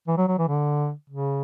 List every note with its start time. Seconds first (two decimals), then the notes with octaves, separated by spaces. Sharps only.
0.08 E3
0.18 F#3
0.28 F#3
0.39 E3
0.49 D3
1.10 C#3